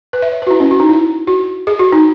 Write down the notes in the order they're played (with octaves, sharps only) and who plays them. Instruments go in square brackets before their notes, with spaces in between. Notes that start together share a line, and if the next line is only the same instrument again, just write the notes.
[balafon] B4
E5
C#5
F#4 B4
E4
C#4
F#4
D#4
E4
F#4
G#4
F#4
D#4